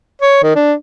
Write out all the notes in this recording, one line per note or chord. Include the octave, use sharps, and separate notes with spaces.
C#5
D#3
D4